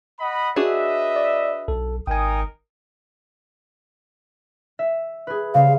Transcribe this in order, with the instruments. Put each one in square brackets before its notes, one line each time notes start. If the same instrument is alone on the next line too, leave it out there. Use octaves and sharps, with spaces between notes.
[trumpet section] D#5 F#5 B5
[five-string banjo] D4 F#4 G#4 [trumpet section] B4 D#5 E5
[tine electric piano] D5
[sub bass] B1 [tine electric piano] A4
[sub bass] G#1 [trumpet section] D#4 A#4 D#6 [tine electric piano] G5 G#5
[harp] E5
G#4 B4
[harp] C#3 G3 C5 [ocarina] F5